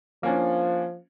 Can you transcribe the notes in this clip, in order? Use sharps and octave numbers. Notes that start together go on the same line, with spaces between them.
F3 A#3 C#4 D4